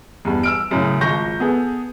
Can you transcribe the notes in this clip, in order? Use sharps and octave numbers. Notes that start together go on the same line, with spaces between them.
E2 G2
E6 F6 D7
F#2 A2 C#3
G#1 F4 C#6 G6 A#6
B3 G#4 A4